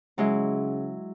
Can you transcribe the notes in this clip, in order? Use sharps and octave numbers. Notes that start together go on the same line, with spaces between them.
C#3 F#3 G#3 E4